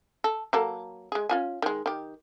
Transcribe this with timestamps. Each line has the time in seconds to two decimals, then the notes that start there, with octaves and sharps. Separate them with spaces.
0.24 A4
0.53 F#3 A#3 A4
1.12 G#3 G#4
1.29 C#4 F4 G#5
1.62 D#3 G#3
1.86 D#3 G4